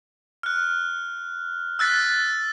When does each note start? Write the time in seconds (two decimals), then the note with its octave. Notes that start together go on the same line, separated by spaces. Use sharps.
0.43 F6 F#6
1.79 E6 F#6 A6 B6